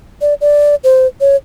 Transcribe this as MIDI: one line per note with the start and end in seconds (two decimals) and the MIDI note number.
0.21 0.34 74
0.41 0.75 74
0.84 1.07 72
1.21 1.36 73